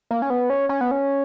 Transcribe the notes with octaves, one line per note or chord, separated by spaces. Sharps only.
A#3
C#4
B3
C#4
C#4
B3
C#4